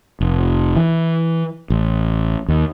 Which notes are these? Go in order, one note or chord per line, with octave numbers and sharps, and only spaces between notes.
F1
E3
A1
D#2